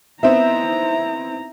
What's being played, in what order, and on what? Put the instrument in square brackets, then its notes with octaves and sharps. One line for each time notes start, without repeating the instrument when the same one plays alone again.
[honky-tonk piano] B3 C4 D#4 [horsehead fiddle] E4 A#5 [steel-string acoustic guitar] E5